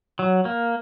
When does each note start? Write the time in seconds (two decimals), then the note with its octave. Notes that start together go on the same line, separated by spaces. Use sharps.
0.19 F#3
0.45 A#3